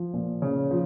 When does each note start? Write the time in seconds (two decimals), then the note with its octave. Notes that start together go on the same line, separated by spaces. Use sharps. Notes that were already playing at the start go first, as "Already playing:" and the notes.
Already playing: F3
0.14 A#2
0.42 C#3
0.71 F3